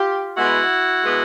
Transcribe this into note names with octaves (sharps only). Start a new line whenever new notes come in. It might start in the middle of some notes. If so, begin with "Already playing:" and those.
Already playing: F4 G4
B2 G#3 B3 E4 F#4
B2 G#3 B3